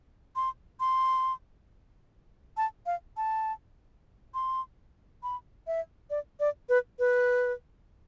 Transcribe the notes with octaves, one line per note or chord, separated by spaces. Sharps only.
C6
C6
A5
F5
A5
C6
B5
E5
D5
D5
B4
B4